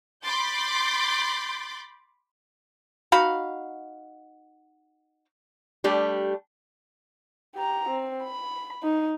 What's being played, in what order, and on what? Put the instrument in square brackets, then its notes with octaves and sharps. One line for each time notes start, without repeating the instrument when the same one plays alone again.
[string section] B5 C6 D6 G6 A6
[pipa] D#4 F#4 F5 B5
[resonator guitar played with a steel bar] G3 A3 D4 G4
[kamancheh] G4 A#5
C4
B5
D#4